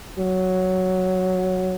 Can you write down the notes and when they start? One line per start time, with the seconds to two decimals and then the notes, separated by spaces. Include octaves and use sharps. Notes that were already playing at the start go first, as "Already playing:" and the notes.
0.18 F#3